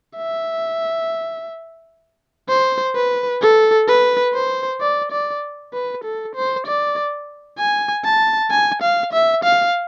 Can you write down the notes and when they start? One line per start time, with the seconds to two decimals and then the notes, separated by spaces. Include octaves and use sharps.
0.17 E5
2.49 C5
2.95 B4
3.42 A4
3.88 B4
4.34 C5
4.81 D5
5.12 D5
5.73 B4
6.04 A4
6.35 C5
6.67 D5
7.59 G#5
8.05 A5
8.51 G#5
8.82 F5
9.13 E5
9.44 F5